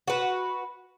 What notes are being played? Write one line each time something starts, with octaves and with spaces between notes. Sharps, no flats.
F#4 B4